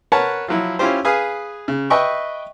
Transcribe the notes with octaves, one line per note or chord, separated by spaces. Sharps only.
A#4 B4 C#5 F#5 A5
F3 F#3 E4
C#4 E4 F4 G4 C5
G#4 B4 F5 G#5 D#6
C#3
B4 D#5 E5 G5 C#6